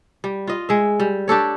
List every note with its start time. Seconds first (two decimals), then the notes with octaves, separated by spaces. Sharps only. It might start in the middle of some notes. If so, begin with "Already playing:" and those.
0.24 G3
0.47 F4 D#5
0.69 G#3 E5
1.00 G3
1.28 D4 G4 A4 C#5